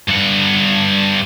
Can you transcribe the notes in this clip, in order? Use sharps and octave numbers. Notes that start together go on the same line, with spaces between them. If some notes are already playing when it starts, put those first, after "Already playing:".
G2 F#5